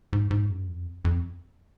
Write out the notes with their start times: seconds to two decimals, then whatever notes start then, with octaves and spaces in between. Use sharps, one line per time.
0.13 G#2
0.31 G#2
0.49 F#2
0.68 F2
1.05 F2